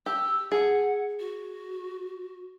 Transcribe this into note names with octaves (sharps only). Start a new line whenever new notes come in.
G4 E6
G#4 F#5
F#4